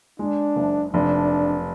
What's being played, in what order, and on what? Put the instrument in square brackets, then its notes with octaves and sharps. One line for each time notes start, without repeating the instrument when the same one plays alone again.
[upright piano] G#3 [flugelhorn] D4
[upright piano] F#1
[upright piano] F1 [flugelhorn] D4